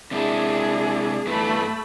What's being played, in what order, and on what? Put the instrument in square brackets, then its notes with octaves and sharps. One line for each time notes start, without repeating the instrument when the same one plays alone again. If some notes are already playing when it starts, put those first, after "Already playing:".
[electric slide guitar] C3 G#3 E4 [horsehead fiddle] D4 G#4
[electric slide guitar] G2 E3 B3 [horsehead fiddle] A3 B5